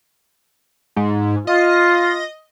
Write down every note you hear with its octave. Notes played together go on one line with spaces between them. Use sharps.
G#2
F4 D#5